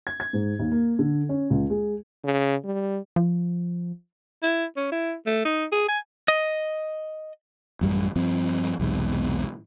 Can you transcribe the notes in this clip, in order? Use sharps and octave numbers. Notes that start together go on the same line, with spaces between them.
G#6
G#6
G#2
D#2
A#3
D3
C#4
C#2
G#3
C#3
G3
F3
E4
C#4
E4
A3
D#4
G#4
G#5
D#5
A1 F#2 G3
G2 F3 C4
B1 E2 G#2 C3